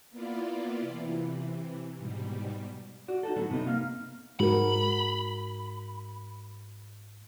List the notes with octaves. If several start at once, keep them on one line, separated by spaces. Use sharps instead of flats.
A#3 B3 E4 F4 D5
C3 E3
G#2 B2 G3
F#4 D5
D#4 F#4 A4
A2 D3 F#3 B3 F#5
G2 C3 B3 D#4
A#3 F5
G#2 F#4 A#4 B5